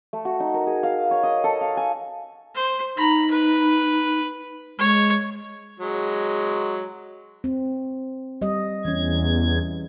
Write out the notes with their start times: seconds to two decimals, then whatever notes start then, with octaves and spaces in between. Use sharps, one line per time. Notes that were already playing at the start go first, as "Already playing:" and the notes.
0.13 A3
0.25 F#4
0.40 D#4
0.54 A#4
0.67 G#4
0.83 F5
1.11 C#5
1.23 D#5
1.44 A4
1.61 F5
1.77 G#5
2.55 C5
2.97 D#4 A#5 B5
3.31 B4
4.79 G#3 C#5
5.80 F#3 G#3
7.44 C4
8.42 G3 D#5
8.85 E2 E3 C#4 G#6